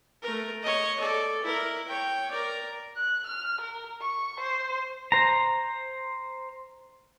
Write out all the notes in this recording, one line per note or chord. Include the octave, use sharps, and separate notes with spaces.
A3 A#4
C#5 D#5
A4 D5
E4 A#4
C#5 G5
A#4 D5
F#6
F6
A#4
C#6
C5
C5 A#5